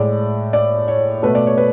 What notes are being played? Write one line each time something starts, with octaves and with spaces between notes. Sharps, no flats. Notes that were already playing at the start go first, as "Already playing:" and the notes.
Already playing: A2 G#3 D5
D5
C#5
B2 A3 B4
D5
C#5
B4